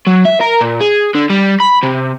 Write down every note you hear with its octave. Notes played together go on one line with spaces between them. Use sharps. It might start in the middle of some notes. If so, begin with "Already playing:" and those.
F#3
E5
A#4
A#2
G#4
D3
G3
B5
C3